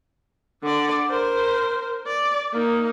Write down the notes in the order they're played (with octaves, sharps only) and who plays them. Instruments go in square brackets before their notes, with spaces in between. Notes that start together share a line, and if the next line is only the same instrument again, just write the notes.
[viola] D3 D5
A#4 C5
D5
A#3 D#4